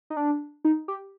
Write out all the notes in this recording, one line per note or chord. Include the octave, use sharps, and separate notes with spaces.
D#4
D4
D#4
G4